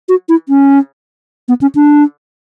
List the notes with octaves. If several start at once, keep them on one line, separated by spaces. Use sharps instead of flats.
F#4
E4
C#4
B3
C#4
D4